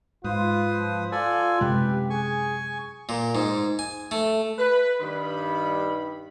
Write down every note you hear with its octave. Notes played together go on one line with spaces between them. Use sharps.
G#2 F4 B4 C5 D#6
F3
F4 A4 D5 G#5
F#2 C3 G#3 G4 B4
G#4 G#5 C#6
A#2
G#2
G#5
A3
B4
G2 D#3 B5